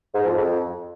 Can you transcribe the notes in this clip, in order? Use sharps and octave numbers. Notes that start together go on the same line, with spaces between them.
G#2
F2
F2